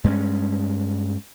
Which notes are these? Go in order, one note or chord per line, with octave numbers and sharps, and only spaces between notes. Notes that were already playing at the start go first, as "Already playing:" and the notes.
G2 G#3 A#3 C#4